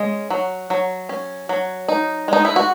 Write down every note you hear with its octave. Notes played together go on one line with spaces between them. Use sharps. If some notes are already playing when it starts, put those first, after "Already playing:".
Already playing: G#3 C#4
F#3
F#3
C#4
F#3
D#4
G#3 D#4
E4
F#4